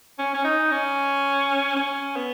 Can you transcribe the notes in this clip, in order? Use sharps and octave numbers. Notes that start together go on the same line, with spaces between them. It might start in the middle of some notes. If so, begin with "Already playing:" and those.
C#4
C#4
D#4
C#4
C#4
B3